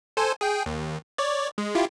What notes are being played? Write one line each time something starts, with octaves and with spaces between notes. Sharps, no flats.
A4 C5 G#5
G#4 G5
D#2
C#5 D5
G#3
E4 F4 G4